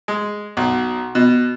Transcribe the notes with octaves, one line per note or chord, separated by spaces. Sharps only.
G#3
B1
B2